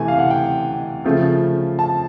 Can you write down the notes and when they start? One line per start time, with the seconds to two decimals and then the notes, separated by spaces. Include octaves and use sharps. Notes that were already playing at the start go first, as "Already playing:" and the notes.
Already playing: C3 E3 A3 G#5
0.08 F5
0.19 F#5
0.31 G5
1.04 C#3 F3 A3
1.79 A5